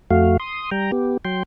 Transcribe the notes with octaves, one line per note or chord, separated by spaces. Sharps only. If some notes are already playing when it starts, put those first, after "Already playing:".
F2 A3 F#4 F5
C6 D#6
G3 G5 A#5
B3 G4
F#3 G5 C6